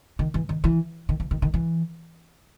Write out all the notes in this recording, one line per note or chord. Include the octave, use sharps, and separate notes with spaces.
D#3
E3
D#3
E3
D#3
E3
D#3
D#3
E3